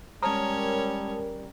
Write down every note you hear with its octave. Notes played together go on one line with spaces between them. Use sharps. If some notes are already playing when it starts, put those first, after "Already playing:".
G3 G#3 C#4 A#4 C#5 A5 D#6